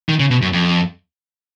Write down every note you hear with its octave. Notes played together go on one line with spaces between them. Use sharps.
D#3
C#3
B2
F#2
F2